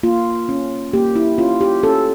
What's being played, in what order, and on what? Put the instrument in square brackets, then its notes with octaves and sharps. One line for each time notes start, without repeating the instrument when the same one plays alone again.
[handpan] A#3 F4
C#4
A#3 G4
E4
C#4 F4
G4
C#4 A4